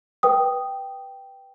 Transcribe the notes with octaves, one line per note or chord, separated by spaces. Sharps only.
B4 G5 D#6